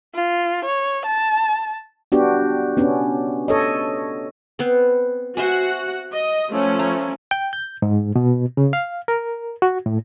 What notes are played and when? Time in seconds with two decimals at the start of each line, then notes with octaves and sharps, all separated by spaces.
0.14 F4
0.65 C#5
1.06 A5
2.12 B3 D4 F#4 G4
2.77 B3 C#4 D4
3.48 A4 C#5 D#5
4.59 B3 C4
5.37 F#4 C5 E5 F#5 G#5
6.13 D#5
6.50 F3 A3 C#4
6.79 A#5
7.31 G5
7.53 G6
7.82 G#2
8.16 B2
8.57 C#3
8.73 F5
9.08 A#4
9.62 F#4
9.86 A2